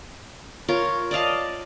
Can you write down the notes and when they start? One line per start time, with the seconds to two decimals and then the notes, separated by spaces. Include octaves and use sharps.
0.68 F4 A#4 C#5
1.11 D5 D#5 F5 A5